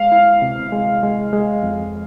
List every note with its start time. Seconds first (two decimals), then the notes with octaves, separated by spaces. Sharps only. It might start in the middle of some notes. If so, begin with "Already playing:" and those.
Already playing: G#3 F5
0.12 E4
0.42 C3
0.72 G#3
1.03 G#3
1.33 G#3
1.63 F2